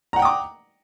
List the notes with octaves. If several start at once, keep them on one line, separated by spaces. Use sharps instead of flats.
F#5 G5 A#5 D6 D#6